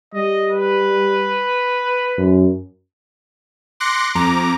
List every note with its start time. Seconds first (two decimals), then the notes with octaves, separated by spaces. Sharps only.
0.14 G3 D#5
0.52 B4
2.18 F#2
3.80 C6 D6 F#6 A#6 C#7
4.15 F2 A#5 D6